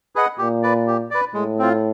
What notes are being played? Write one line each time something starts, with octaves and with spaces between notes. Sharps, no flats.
G#4 B4 D#5 F#5
A#2 G4
B4 D5
G4
B4 D5
A2 G#3
C4 F4